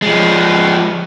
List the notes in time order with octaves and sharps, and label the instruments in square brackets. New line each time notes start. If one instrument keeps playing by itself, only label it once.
[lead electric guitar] F3 G#3